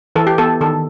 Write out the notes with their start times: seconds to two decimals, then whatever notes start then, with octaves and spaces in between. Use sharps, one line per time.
0.16 E3 A4
0.27 G4
0.38 B3 A4
0.61 D#3 A4